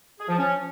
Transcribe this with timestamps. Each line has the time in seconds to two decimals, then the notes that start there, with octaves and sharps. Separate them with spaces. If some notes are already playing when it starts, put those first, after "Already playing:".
0.19 G#4
0.28 F3
0.38 C#4